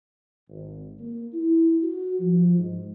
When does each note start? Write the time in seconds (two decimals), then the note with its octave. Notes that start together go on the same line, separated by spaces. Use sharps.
0.50 G#1
1.00 A#3
1.33 E4
1.82 F#4
2.20 F3
2.57 G#2